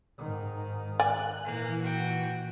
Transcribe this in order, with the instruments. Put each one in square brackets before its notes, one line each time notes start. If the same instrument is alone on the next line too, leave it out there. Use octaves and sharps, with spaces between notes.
[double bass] G#2 D#3
[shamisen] D5 G#5 [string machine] F#6
[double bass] A#2 [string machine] E3 [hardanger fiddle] A#3
[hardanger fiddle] F#4 G5